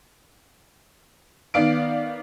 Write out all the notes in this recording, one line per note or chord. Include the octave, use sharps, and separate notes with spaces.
D#3 B3 D5 F5 D7